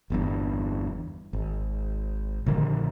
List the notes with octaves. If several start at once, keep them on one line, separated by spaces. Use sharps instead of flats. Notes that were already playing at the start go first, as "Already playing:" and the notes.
G1 E2 G2
G#1
A#1 D3 D#3 G3